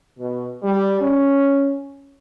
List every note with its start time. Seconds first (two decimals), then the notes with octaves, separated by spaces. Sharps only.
0.19 B2
0.63 G3
1.01 C#4